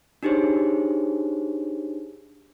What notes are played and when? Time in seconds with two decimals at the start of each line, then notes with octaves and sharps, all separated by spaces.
0.23 D4 D#4 G4 G#4 C5 C#5